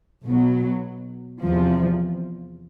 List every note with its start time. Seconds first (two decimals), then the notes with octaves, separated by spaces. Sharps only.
0.25 B1 B2 F#3
1.42 E2 C3 F3